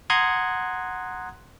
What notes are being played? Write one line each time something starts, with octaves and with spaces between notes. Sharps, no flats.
F#5 A#5 C6 D#6 F#6 G#6